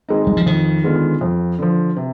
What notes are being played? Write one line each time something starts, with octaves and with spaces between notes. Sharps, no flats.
D#3 G#3 C4 D#4
G3
F3
F2 D#3
D3 G#3 B3 F4
F2
D3 F3
C3